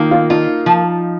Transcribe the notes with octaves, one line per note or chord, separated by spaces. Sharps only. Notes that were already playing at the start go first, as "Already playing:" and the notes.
Already playing: D#3 A#3 D#4 F4
F4
D#4 F4
F3